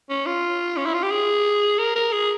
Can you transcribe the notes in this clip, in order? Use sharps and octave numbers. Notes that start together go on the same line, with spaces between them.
C#4
F4
C#4
E4
F4
G4
G#4
A#4
A#4
G#4